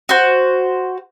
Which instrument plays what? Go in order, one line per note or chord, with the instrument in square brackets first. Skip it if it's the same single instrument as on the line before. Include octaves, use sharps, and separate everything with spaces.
[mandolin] F#4 C5